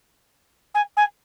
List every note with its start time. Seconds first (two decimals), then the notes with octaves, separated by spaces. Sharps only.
0.74 G#5
0.97 G#5